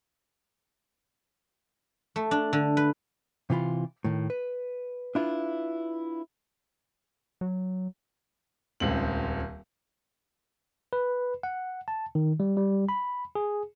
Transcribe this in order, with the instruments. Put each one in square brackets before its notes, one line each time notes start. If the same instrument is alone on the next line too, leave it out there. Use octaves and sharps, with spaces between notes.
[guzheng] A3
D4
D3
B4
[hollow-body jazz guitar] C3 E3 F4 B5
A2 D#3
B4
D4 E4 F4 B4
[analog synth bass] F#3
[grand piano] D#1 C#2 C4 F#7
[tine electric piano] B4
F#5
A5
D#3
G3
G3
B5
G#4